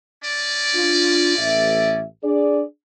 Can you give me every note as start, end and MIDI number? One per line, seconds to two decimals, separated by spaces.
0.24 2.02 61
0.24 2.02 74
0.75 1.35 62
0.75 1.35 65
1.38 2.03 33
1.38 2.03 76
2.24 2.62 62
2.24 2.62 68
2.24 2.62 74